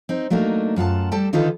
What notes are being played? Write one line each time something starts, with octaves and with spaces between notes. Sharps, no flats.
C4 D#4
F#3 A3 A#3 D4 D#4
F#2 F4 F#5 A5
G3 A4 G5 A5
D3 D#3 D#4 F4 A4 B4